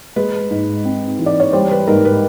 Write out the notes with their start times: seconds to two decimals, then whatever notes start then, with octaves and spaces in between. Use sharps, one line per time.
0.16 G#3 B4
0.51 G#2
0.85 C4
1.19 E3
1.26 D5
1.40 C#5
1.53 G3 C5
1.71 B4
1.88 G#2 A#4
2.05 B4